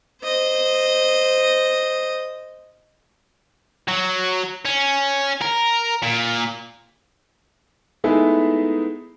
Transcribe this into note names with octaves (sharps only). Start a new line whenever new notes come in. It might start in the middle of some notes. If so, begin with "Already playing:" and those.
C5 D#5
F#3
C#4
A#4
A#2
G#3 A3 B3 D#4 E4 G#4